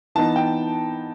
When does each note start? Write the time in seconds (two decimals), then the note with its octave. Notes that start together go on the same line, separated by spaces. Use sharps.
0.15 E3 B3 D#4 A5
0.36 G5